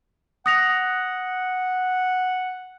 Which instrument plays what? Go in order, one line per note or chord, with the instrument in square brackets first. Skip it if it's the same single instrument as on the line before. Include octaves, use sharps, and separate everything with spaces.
[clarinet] F#5 [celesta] D#6 A#6 F7